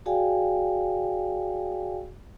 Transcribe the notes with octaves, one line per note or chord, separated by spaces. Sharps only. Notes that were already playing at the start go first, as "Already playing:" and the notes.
F#4 G#4 D5 F5 G5 G#5